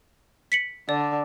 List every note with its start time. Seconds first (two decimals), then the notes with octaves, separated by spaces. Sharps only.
0.52 B6 C#7 F#7
0.89 D3 D5